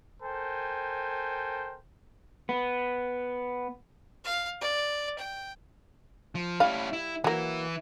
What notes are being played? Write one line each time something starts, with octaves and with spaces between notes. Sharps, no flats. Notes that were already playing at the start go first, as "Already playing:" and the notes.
A4 A#4 C5 G5 G#5
B3
F5
D5
G5
F3
G3 C#4 E4 F5
E4
E3 F#3 A#3 E4